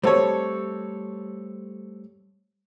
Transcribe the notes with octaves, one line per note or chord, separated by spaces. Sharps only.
G3 A3 C4 A4 C#5